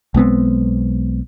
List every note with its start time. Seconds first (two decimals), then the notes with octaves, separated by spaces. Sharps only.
0.14 B1 G#3 B3 C4